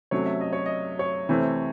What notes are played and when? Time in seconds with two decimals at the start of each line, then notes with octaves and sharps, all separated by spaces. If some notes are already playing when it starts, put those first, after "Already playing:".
0.11 C3 F#3 A3 C#4 C#5
0.26 E5
0.41 D#5
0.53 C#5
0.66 D#5
0.99 C#5
1.29 C3 E3 A3 C4